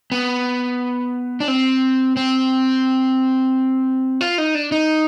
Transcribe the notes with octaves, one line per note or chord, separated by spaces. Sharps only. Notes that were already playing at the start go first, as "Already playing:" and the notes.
B3
D4
C4
C4
F4
D#4
D4
D#4